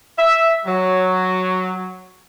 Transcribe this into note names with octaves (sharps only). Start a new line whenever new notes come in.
E5
F#3